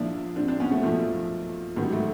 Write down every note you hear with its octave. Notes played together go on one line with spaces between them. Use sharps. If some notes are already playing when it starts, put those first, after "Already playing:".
Already playing: A#1 A#2 F3 D4 E4
C4 D4
C4 D4
B3 C#4
A3 B3
B1 A#2 F3 A3
A1 G#2 D#3 F#3
A3